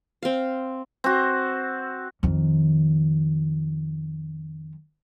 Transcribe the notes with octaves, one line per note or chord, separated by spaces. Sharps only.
C4 F5
C4 F#4
F2 D#3